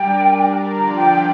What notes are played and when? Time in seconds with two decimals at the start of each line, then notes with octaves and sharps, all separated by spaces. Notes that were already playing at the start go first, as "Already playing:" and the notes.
Already playing: G3 D4 A#4 D5 G5
0.73 D3 F3 D4 F4 D5 A#5
0.97 G5
1.13 G5